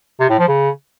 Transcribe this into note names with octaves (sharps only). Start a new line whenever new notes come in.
C3
A2
F3
C#3